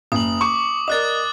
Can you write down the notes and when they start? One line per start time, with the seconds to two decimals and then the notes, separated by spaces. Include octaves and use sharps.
0.12 F#1 D#6 F#7
0.41 C#6 D6
0.88 A#4 D5 D#5 D#6 F#6 A6